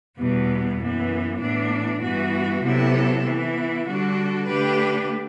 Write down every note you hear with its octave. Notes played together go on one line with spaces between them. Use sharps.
E2 B2 G3 B3
F#2 E3 B3
A2 E3 B3 D4
G2 E3 B3 F#4
C3 F#3 B3 E4 A4
E3 B3 E4
D3 G3 D4 F#4 A4
D3 A3 D4 G4 B4